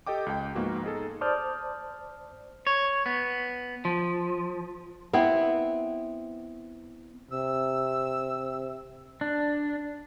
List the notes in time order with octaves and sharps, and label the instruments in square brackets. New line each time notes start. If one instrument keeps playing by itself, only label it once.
[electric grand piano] G4 A4 D#5 G5 D6
C#2 G5
G#2 F3 A#3 B3 F#4
D#4 G#4 A4
[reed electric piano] C5 D5 A5 D#6 F6 G6
[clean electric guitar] C#5
B3
F3
[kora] B3 C4 E4
[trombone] C3 [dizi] E6
[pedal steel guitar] D4